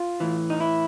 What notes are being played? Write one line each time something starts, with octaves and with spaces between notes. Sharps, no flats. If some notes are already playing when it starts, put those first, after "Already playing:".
Already playing: F4
A2 E3
D#4
E4